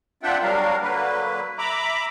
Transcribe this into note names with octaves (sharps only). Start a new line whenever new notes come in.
C4 D4 F4 E5 F#5 G5
F#3 G3 D4 A#4 F5
D3 F#3 A#3 B4
E5 A#5 B5 D6